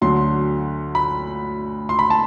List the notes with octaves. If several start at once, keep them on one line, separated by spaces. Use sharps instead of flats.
D2 D3 F#3 C6
B5
C6
B5
A5